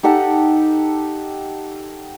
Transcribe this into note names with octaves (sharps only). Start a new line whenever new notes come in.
D#4 G4 A4 F#5